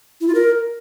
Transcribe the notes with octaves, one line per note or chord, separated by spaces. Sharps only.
E4
F4
A#4